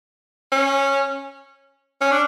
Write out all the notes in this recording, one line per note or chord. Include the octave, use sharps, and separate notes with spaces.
C#4
C#4
D4